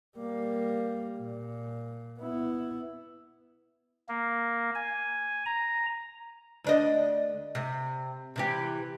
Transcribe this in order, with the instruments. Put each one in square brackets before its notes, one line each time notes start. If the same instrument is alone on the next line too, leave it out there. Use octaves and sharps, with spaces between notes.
[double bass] G3 A#3
A#2
B3 E4
[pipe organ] A#3
G#5
A#5
[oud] D2 D4 D#5
C3
C3 E3 G4